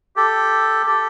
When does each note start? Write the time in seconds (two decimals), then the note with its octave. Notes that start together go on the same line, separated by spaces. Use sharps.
0.16 G4 A4
0.86 G4 A4